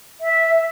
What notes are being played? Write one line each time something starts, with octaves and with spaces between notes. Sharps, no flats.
E5